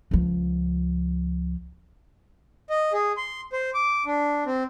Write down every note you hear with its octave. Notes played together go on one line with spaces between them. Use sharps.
C#2 F3
D#5
G#4
C6
C5
D6
D4
C4